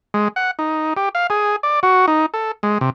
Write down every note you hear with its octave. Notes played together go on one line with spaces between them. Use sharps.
G#3
F#5
D#4
G4
F5
G#4
D5
F#4
D#4
A4
G#3
C3